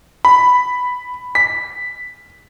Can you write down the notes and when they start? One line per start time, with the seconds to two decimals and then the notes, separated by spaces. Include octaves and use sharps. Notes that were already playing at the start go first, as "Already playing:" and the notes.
0.25 B5
1.35 B6